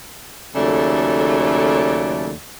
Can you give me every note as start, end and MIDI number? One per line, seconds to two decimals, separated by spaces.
0.56 2.32 39
0.56 2.32 49
0.56 2.32 54
0.56 2.32 57
0.56 2.32 69
0.56 2.32 74